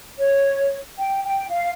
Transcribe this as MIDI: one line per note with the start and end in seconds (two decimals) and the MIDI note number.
0.19 0.76 73
0.99 1.23 79
1.25 1.46 79
1.50 1.72 77